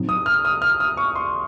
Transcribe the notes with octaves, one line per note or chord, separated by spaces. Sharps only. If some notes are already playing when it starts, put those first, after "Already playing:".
Already playing: A2 F#3 C4 D#4
D#6
F6
D#6
F6
D#6
C#6
C6